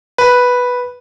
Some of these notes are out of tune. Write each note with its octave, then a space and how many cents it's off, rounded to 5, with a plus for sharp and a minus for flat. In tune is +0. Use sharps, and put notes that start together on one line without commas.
B4 -5